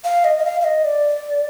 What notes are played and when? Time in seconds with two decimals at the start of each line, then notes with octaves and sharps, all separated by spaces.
0.04 F5
0.24 D#5
0.38 D#5
0.45 F5
0.61 F5
0.64 D#5
0.85 D5